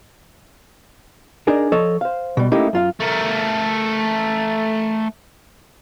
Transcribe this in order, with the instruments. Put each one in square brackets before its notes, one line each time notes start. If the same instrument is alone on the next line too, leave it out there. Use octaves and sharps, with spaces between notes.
[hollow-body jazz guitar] D4 D#4 G#4 A#4
F3 A4 C#5 D#5
C5 F5
B2 G3
A3 A#3 C#4 D#4 E4 G4
F#2 F4 F5
[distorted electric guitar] A3 A#4